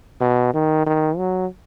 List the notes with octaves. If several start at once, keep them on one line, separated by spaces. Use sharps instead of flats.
B2
D#3
D#3
F#3